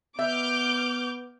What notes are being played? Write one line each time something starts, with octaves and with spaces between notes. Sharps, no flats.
B3 E5 D6 F6 G6